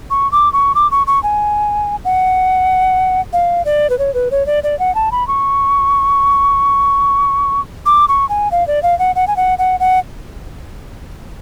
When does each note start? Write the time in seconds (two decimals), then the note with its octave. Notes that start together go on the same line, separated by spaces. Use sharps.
0.10 C#6
0.32 D6
0.53 C#6
0.75 D6
0.91 C#6
1.07 C#6
1.23 G#5
2.05 F#5
3.33 F5
3.65 D5
3.90 B4
3.99 C#5
4.14 B4
4.31 C#5
4.46 D5
4.63 D5
4.79 F#5
4.95 A5
5.12 B5
5.28 C#6
7.86 D6
8.08 C#6
8.29 G#5
8.51 F5
8.67 D5
8.83 F5
8.99 F#5
9.16 F#5
9.27 G#5
9.37 F#5
9.58 F#5
9.80 F#5